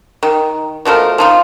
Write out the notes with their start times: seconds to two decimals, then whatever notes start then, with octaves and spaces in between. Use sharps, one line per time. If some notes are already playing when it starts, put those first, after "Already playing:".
0.23 D#3
0.85 B2 F3 A3 A#4
1.18 F3 D#4 F4